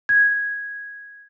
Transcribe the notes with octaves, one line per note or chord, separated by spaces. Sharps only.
G#6